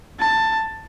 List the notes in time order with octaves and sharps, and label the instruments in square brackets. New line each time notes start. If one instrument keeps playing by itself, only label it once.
[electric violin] A5